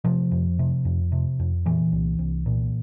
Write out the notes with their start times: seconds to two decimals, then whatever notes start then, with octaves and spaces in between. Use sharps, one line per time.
0.04 C3 F3
0.32 F2
0.59 C3
0.85 F2
1.12 C3
1.39 F2
1.65 A#2 E3
1.92 C2
2.19 C2
2.46 A#2